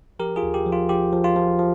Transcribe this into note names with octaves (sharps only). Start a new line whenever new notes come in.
F3 G4 A#4
F4 G#4
D#2
G4
F3
F4
F3 G4
F3
F4
F3
F3